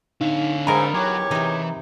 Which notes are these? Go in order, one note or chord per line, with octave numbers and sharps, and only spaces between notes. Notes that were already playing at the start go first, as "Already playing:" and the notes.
D3 D#4 F5
G#2 D#4 A#4 A#5 B5
E2 F#3 G4 C#5
C3 E3 D#4